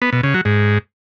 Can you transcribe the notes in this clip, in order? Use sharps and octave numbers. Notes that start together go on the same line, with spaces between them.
B3
B2
C#3
F#3
G#2